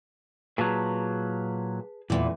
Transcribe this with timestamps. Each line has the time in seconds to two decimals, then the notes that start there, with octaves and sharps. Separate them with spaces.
0.58 A#2 F#3 G#4 B4 A5
2.10 E2 A#2 E3 G#3 A3